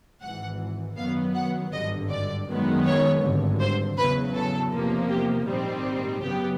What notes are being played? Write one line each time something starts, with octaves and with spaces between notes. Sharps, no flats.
G#1 G#2 E3 F#5
F#2 D#3 F#3 B3 F5
F#5
G#1 G2 D3 D#5
D5
F#2 D#3 G#3 B3
C#5
G#1 G2 D3
C5
E2 C#3 F#3 B4
A4
E2 C3 F3 A#3
G4
A#1 G#2 D#3 G3 C4
F#2 C#3 F#3 B3 G4